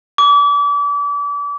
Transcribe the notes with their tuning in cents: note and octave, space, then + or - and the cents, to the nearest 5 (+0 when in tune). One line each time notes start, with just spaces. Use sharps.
D6 -35